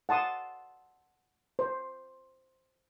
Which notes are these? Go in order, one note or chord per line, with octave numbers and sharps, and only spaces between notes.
F#5 A5 C6 D#6
C5